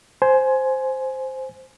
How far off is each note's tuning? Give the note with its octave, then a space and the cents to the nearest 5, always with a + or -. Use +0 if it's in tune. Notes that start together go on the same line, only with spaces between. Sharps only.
C5 +0 G#5 +15